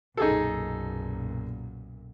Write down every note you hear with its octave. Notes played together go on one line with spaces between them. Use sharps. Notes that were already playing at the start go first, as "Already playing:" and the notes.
B1 F#2 A#2 D#4 G#4 A4